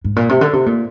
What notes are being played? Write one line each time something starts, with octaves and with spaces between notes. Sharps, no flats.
G#2
A#2
C3
D3
C3
A#2